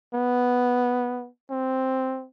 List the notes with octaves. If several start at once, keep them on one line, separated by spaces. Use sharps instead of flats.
B3
C4